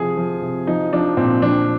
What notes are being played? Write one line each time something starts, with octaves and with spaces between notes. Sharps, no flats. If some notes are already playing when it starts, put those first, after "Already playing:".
Already playing: C3 F3 G#4
F3
C3
F3 D#4
F3 D4
A#2 C4
F3 D4